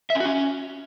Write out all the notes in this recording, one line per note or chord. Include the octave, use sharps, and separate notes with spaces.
E5
C#4
F#4
C#4